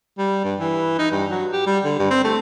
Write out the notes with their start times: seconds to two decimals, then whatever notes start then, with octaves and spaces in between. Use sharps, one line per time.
0.18 G3
0.44 G2
0.60 E3
0.99 D#4
1.12 G2
1.31 F#3
1.52 G4
1.67 G3
1.85 D3
1.99 G2
2.10 C4
2.25 A3